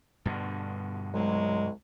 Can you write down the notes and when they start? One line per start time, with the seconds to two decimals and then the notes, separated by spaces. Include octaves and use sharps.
0.25 G2 B2 D3
1.14 C2 F#3 G#3